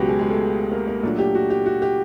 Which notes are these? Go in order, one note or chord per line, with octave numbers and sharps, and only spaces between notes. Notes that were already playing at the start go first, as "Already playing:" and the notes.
Already playing: C#2 B2 F#3 B3 F#4 G4
G#3 G#4
G#3 G#4
A3 A4
A#3 A#4
A#3 A#4
A#2 F#3 A3 D4 A4
G4
F#4
G4
F#4
G4